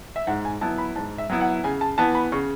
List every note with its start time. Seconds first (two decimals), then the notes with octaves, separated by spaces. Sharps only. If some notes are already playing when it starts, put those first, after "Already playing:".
0.16 E5
0.27 G#2 F#5
0.45 G#5
0.61 F#3 B3 E4 A5
0.78 B5
0.96 G#2 A5
1.18 E5
1.30 F#3 B3 E4
1.41 F#5
1.64 C#3 G#5
1.81 A5
1.98 E3 B3 A5
2.15 B5
2.32 C#3 C#6